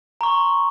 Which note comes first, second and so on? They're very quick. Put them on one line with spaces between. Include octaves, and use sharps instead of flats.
A#5 C#6 C6